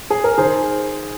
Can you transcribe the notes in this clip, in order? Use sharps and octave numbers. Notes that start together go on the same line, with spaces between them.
G#4
A#4
D#3 G#4 C5